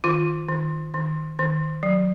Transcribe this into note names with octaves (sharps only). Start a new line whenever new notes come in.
D#3 F4
D#3
D#3
D#3
F#3